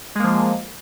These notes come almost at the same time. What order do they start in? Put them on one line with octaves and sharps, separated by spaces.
G#3 A#3 F3